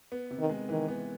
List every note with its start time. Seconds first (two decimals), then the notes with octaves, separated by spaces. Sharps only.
0.12 B3
0.31 C3
0.40 D#3
0.50 G#3
0.69 D#3 E3
0.88 B3